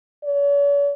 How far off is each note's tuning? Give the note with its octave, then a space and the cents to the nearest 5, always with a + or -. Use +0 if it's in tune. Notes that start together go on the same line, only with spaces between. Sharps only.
C#5 +45